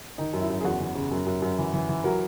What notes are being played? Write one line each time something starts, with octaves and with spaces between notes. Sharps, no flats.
D#3 D#4
F#2
E4
F#2
G#4
E2 F#4
E2
C#3
F#2
F#2
F#2
E3
E3
E3
F#3 A#4